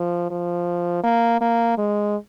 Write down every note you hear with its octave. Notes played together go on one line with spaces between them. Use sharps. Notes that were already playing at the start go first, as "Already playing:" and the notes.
Already playing: F3
F3
A#3
A#3
G#3